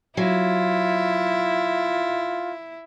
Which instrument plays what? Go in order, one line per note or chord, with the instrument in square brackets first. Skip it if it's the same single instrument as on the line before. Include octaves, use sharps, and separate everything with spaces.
[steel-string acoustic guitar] F#3 [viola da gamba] E4 [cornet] F4